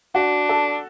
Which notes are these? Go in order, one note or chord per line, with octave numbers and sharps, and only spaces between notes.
D4 F#4
A4